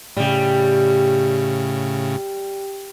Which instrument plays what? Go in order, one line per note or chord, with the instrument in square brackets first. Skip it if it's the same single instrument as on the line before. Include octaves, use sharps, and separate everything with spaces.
[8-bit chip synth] A2 C#3 [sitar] G3